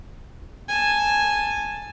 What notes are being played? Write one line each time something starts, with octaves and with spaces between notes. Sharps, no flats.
G#5 A5